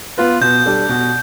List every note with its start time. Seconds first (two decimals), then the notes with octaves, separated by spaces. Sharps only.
0.18 B3 F4 B4
0.41 B2 G6
0.66 G3 D4 A4
0.89 B2